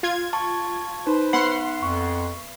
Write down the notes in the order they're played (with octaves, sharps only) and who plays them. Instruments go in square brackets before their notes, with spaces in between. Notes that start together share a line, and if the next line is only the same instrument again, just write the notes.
[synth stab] F4 G#6
[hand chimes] A5 C#6
[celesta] D#4 [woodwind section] B4 C5
[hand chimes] B3 B5 C7 [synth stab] F#5 C6
[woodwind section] F2 [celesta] C#6